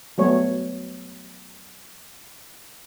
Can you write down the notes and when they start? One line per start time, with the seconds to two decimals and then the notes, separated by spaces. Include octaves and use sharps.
0.18 F#3 G3 A3 B3 C#5